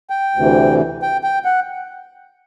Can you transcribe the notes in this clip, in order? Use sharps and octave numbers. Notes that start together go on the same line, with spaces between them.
G5
D2 C3 E3
G5
G5
F#5